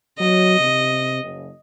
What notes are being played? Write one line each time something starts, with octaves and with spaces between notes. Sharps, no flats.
F#3 D#5
C3
F#1